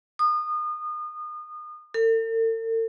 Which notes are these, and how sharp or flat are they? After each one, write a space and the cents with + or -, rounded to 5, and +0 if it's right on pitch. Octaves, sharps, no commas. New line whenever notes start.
D#6 -30
A4 +45